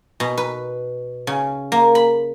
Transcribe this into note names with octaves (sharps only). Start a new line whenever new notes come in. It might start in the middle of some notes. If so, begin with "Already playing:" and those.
B2
B4
C#3
A#3
B5